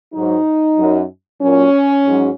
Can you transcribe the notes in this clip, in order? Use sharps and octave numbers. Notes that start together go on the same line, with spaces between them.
G#2 F#3 D#4
F#2 F#3
A#2 F#3 C#4
G#2 F#3